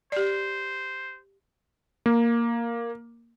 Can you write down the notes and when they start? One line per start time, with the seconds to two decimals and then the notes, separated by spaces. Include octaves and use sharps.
0.12 G4 C5 D5
2.06 A#3